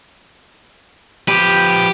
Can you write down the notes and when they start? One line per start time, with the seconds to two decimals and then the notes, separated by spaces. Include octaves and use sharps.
1.28 F3 G4 B4